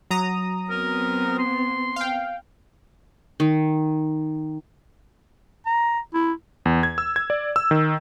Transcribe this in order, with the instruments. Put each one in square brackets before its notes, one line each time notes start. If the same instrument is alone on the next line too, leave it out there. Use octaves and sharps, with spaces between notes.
[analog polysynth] F#3 A#5 D#6
[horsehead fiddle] B3 C4 [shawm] A#4
[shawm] C6
[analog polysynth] F5 G5
[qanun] D#3
[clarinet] A#5
E4
[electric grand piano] E2
G#6
E6
G#6
D5
E6
D#3